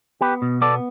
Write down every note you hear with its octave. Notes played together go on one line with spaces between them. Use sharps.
B3 G4 B4
B2
B3 A4 D5